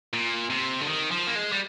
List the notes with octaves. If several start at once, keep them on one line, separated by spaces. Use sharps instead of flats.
A#2
C3
D3
D#3
F3
A#3
G#3
G3